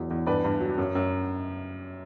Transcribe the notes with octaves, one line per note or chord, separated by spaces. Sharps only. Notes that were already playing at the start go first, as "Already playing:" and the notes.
Already playing: E2 F#3
E2
G2 B4 D5
G2
F#3
F#2
F#2